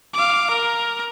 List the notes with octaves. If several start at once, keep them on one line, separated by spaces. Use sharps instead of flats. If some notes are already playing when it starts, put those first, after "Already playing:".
F5 D6
A#4